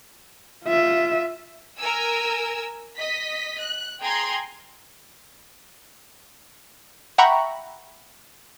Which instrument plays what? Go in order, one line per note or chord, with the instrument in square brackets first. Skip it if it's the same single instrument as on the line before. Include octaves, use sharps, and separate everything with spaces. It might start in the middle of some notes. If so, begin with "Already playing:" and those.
[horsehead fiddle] F4 E5
[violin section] A#4 G#5 E6
D#5 B6
F#6
G#4 G5 A#5 C6 G#6
[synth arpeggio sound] E5 F#5 G5 A#5 B5 C#6